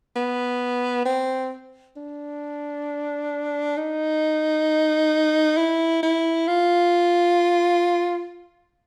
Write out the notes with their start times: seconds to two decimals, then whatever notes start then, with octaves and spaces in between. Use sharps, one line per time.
0.16 B3
1.05 C4
1.97 D4
3.77 D#4
5.57 E4
6.03 E4
6.47 F4